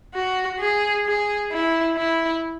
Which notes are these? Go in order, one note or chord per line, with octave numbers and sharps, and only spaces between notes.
F#4
G#4
G#4
E4
E4